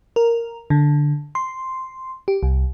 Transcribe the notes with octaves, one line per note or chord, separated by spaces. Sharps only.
A#4
D3
C6
G4
C2